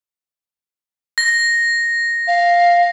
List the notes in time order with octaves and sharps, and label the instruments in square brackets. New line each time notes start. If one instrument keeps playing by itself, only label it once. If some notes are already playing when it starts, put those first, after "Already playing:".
[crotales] A#6
[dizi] F5